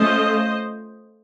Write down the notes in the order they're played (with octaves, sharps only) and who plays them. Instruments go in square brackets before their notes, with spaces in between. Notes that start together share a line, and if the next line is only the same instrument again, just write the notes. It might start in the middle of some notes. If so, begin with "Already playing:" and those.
Already playing: [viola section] A3 C#4 F4 C5 D#5